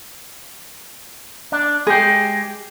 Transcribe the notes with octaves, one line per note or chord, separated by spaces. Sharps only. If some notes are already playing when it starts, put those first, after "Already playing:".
D4
G#3 G4 G#4